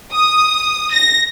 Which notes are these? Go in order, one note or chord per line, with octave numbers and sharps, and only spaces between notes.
D#6
A#6